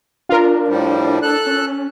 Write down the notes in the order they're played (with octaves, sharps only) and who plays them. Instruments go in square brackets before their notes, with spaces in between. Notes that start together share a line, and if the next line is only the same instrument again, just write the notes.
[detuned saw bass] D4 [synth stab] F4 A#4
[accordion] A2 F3 G3
A4 F#6
[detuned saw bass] C#4